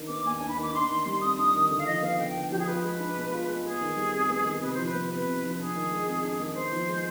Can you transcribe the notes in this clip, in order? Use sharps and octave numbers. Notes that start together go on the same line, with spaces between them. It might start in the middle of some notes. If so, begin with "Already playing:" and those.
Already playing: D#3 D4
B3 D6
D#2 G#5
D4 G#5
B5
D#3 D6
D4 C6
D#3
G3
F2 D#6
D4
D#3
D3
F5
F3 D#5
B3 F5
D3 G5
D3
F3 G4
G#4
F4 B4
G#3
D4
B2
F4
G#3
B3 G#4
D#3
G3
F2
B3
D#3
C3 B4
F3 C5
B4
B3
C3 B4
C3
F3
D4 G#4
D#3
G#3
F2
D4
D#3
B3 C5
F3
G#3